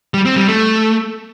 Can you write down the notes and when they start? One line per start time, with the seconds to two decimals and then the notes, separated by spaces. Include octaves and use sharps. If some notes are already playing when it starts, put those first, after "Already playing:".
0.14 G3
0.25 C4
0.37 G3
0.48 A3